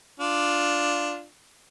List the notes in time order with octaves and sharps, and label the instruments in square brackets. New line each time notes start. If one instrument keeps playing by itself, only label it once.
[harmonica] D4 F4